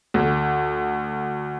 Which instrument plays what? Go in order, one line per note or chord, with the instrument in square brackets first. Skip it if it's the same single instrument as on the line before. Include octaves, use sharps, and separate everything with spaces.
[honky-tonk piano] D2